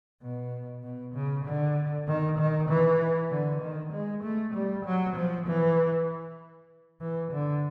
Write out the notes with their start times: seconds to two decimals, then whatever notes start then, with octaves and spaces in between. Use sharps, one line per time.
0.22 B2
0.84 B2
1.15 C#3
1.45 D3
2.07 D#3
2.38 D#3
2.69 E3
3.31 D3
3.61 D#3
3.92 G#3
4.23 A3
4.54 G3
4.85 F#3
5.16 F3
5.47 E3
7.01 E3
7.32 D3